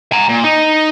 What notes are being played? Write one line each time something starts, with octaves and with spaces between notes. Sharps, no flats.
G#5 A#5
A#2
D#4